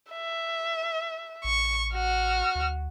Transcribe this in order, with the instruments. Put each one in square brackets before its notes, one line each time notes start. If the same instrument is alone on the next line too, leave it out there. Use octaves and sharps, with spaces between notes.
[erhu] E5
[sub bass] A1 [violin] C#6
[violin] F#4 [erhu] F6
[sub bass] D2